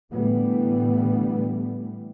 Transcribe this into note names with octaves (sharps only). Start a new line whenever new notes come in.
A2 D3 E3 G3 A3 B3